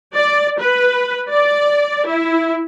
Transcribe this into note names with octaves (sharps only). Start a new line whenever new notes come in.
D5
B4
D5
E4